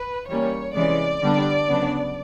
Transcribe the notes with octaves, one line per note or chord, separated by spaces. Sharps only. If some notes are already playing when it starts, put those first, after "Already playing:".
Already playing: B4
E3 G3 A#3 C#4 C#5
C3 E3 G#3 C#4 D5
D3 G3 B3 D4
C#3 F#3 B3 D4